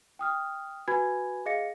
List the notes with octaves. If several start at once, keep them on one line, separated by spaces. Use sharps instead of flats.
G5 D#6 F6
F#4 B4 G#5 B5 G#6
G#4 D#5 F5 A#6 C#7